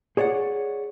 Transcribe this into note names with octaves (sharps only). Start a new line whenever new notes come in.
G#4 C#5 D5 E5 F#5